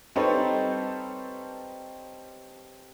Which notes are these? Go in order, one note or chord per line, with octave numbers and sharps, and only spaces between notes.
G3 C4 D#4 A4 B4 C#5